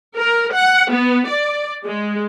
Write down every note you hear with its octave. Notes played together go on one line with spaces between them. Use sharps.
A#4
F#5
B3
D5
G#3